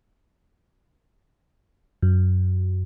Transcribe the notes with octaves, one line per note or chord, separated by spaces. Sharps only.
F#2